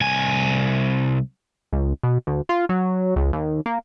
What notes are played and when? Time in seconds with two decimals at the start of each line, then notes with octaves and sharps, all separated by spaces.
0.01 C2 G#5
1.72 C#2
2.03 B2
2.27 D2
2.49 F4
2.69 F#3
3.16 C#2
3.33 D#2
3.66 A#3